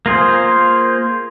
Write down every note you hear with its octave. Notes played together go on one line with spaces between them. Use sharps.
A#3 F4 G#4 C5